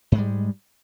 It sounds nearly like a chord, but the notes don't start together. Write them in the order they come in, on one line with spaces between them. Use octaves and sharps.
G#2 G#3 G3